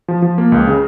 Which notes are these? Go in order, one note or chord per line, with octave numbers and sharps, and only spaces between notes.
F3
F3
A#3
C#2
C#3